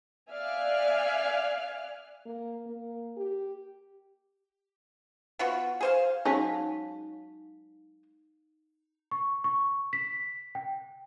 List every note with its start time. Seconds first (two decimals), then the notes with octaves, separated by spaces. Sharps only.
0.29 D5 E5 F5 G#5 F6 F#6
2.26 A#3
2.66 A#3
3.17 G4
5.39 B3 F4 F#4
5.81 G#4 C5 F5
6.25 F#3 G#3 C#4 D#4 F5
9.11 C#6
9.44 C#6
9.93 B6
10.55 G5